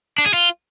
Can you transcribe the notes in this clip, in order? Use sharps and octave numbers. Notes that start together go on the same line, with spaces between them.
D4
G#4
F4